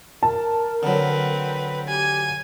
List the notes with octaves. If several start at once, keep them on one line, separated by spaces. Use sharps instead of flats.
A#4 A5
D3 F#3 C4 B4
G4 G#5